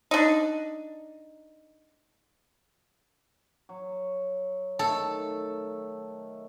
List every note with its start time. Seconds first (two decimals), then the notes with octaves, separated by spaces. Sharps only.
0.11 D4 D#4
3.69 F#3
4.79 D#3 A3 A4